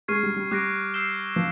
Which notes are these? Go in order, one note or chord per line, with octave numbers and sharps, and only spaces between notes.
G#3 C#6 F6 G#6 C7 D#7
G3
G3
G3 D6 F#6 A#6 D7
E6 G6 C7 E7 G7
F3